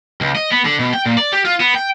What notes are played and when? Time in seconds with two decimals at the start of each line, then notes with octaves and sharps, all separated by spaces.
0.21 C#2
0.35 D#5
0.52 B3
0.65 D3
0.79 B2
0.94 G5
1.06 A#2
1.18 D5
1.33 G4
1.45 F4
1.60 B3
1.75 G5